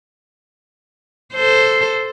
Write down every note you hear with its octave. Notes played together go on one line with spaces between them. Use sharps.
A4 C5